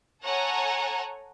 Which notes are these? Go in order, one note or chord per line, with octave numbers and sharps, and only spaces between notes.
A4 C#5 F#5 G#5 A#5